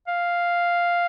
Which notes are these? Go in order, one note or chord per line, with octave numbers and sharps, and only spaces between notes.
F5